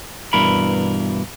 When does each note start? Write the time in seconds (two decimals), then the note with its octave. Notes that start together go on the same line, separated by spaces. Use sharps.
0.33 G2 B2 E3 A#4 B5